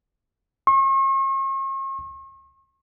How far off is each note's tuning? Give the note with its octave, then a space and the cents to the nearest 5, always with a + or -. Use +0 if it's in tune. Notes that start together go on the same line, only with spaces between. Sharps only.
C#6 -45